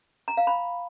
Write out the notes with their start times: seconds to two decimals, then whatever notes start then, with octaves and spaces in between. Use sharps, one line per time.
0.28 A#5
0.37 F5
0.47 B5